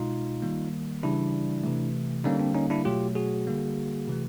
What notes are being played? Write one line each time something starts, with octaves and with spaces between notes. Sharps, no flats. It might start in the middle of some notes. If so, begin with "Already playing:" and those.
Already playing: B2 G#3 D#4 F4
D#3 G3 A#3
C#3 E3 G3 D4 E4
C3 E3 A3
D3 G3 A#3 C#4 D#4
C4 D4
C#4 D#4
D4 E4
B2 F#3 A3 F4 G4
F#4 G#4
D3 G3 A#3
C3 E3 A3